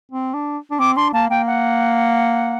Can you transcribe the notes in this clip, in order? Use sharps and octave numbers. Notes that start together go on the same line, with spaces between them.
C4
D4
D4
C4 D6
D4 C6
A#3 A5
A#3 G5
F#5